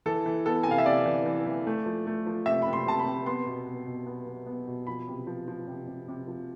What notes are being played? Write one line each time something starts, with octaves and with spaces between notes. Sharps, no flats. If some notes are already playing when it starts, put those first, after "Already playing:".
E3 A4
E3
B3 A4
C3 G#5
F5
E5
C3 D5
E3
E3
E3
A3
F3
A3
F3
C3 E5
C3 B5
C6
C3 A5
B5
C3
B3 C6
B2
B3
B2
B3
B3
B3
B2
F3 B5
C3
F3
F3
C3
C3
C3
F3